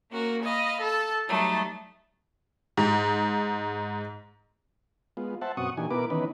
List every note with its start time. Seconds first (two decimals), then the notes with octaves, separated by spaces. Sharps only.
0.11 A#3 C#4 F#4 A#4
0.43 D#5 F5 B5
0.81 A4 A5
1.28 F#3 G3 A3 D#4
2.77 G#2
5.17 G#3 B3 F4
5.41 C5 E5 F#5 A5
5.57 F#2 B2 C4 F#5 C#6 D#6
5.77 A#2 E3 D4 D#4 G4 G#5
5.90 B2 B3 E4 A#4 B4 D6
6.10 D#3 E3 B3 C#4 D#4 B4